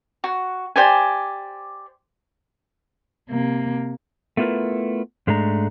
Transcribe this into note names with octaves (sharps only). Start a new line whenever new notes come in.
F#4
G4 C5 D5 G#5
C3 A#3
A3 B3 E4 F4 A#4 B4
G#2 G#3 A3 D4 A#5